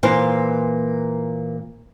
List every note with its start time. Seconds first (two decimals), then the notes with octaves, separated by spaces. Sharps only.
0.03 A#2 E3 A#3 C5 F5